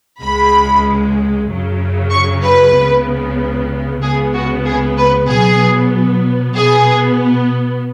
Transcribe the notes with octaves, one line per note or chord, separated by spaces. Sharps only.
C#2 C#3 G#3 B5
F#2 C#3 F#3
C#6
B4
C#2 C#3 B3
C#2 C#3 B3 G#4
F#4
G#4
B4
B2 F#3 B3 G#4
B2 B3 G#4